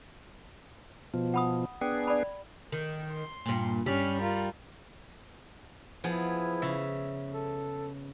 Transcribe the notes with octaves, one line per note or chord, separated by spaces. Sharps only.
B2 F3
F#5 B5 D#6
B3 D4 G#4 G5
D5 B5
D#3
C6
G2 A#2
G2 G3 C#4 G4 F6
F4 A#4
F3 B3 E4 G#4
C#3 E5
A4